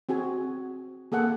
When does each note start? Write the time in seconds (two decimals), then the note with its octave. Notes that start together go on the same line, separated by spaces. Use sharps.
0.09 C4 F#4 G#4 G#5
1.12 A#3 G#4 A4 F#5